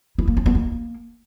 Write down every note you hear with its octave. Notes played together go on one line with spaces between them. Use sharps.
E4
A#3
C#4
B3
A#3